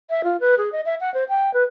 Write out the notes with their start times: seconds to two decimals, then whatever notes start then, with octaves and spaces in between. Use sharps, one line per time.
0.10 E5
0.24 F4
0.40 B4
0.58 G#4
0.72 D#5
0.86 E5
1.01 F#5
1.14 C5
1.29 G5
1.54 B4